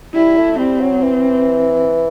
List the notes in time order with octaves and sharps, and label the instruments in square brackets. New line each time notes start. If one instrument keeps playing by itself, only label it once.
[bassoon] G3 [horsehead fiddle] E4
[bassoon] A3
[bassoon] G3 [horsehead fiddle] C4
[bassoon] F#3
E3